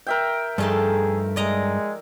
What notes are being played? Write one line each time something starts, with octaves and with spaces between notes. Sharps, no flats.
A#4 E5 G5
G2 F3 A3 D#4 G#4
G#3 D5 D#5 A#5